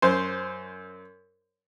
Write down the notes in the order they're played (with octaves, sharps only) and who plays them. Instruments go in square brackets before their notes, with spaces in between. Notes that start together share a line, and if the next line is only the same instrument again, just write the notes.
[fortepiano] F#2 C5